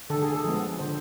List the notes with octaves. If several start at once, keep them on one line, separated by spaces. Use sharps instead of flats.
D3 A4
G#4
A4
F3 G#3 B3
D3 C5